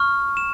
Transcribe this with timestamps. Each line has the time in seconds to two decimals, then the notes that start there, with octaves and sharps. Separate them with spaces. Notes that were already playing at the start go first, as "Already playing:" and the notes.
Already playing: C#6 F6
0.37 E7